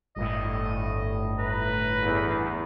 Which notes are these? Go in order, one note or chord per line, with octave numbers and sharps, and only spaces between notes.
G1 A2 D#5
B4 A#5
E2